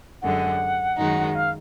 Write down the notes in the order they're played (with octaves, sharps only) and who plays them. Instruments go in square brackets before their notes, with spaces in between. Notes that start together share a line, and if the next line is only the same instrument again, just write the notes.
[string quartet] F#2 D3 G#3 [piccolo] F#5
[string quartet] F#2 D#3 G#3 D#4 F#4
[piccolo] F5